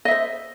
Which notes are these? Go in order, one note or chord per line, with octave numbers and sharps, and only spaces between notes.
C5 D#5 E5